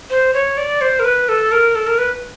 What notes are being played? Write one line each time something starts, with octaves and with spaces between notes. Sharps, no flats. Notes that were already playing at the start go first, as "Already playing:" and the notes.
C5
C#5
D5
C5
A#4
B4
A4
A#4
A4
A#4
B4